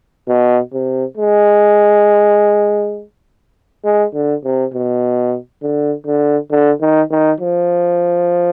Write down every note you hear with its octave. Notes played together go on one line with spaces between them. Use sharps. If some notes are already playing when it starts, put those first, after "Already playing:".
B2
C3
G#3
G#3
D3
C3
B2
D3
D3
D3
D#3
D#3
F3